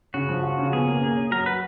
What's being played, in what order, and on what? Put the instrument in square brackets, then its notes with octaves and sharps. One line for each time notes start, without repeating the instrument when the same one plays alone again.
[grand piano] C#3 [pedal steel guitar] F#4
[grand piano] F3
F4
C#3
[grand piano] B2 [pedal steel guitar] G#4
[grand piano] A#3
A#3
C#4
[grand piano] F#3 [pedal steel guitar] A#4
[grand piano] F#4 [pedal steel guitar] B4